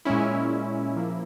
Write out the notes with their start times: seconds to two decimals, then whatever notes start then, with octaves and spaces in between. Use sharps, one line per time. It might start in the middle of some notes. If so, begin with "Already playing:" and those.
0.05 A#2 G#3 C#4 E4
0.96 F3 A#3 E4